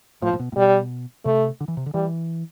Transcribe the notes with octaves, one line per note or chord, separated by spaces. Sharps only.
A2 F3
A2
B2
A2
B2 G3
C3 A3
D3
E3
C3
D3
E3 G3